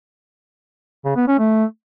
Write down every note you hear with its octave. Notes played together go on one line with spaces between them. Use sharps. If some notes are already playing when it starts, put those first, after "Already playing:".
C#3
B3
C#4
A3